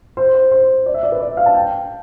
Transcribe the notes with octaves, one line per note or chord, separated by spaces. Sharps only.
C5
C5
C5
D5
E5
D5
B4
D5
E5
F5
A5
G5